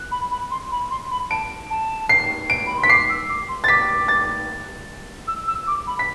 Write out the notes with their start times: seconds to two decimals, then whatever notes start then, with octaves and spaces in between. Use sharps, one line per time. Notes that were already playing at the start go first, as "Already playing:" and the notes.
Already playing: F#6
0.11 B5
0.31 B5
0.51 C6
0.72 B5
0.90 C6
1.11 B5
1.30 A5 D7
1.70 A5
2.09 C7
2.50 D7
2.66 B5
2.78 C6
2.83 B6
2.89 D6 C7
3.09 E6
3.29 D6
3.48 C6
3.64 A6
3.68 D6 B6
4.08 A6
5.27 E6
5.47 E6
5.67 D6
5.87 B5
5.99 B6